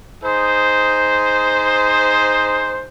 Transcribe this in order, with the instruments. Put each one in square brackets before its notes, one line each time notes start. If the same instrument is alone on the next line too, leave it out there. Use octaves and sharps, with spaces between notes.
[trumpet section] D#4 G#4 C5